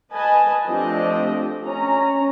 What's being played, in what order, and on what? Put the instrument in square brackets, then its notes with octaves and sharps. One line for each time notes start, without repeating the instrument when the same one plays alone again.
[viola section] B4 D#5 G#5 A5
F3 A3 C4 D4 G4 D#5
C#4 A#5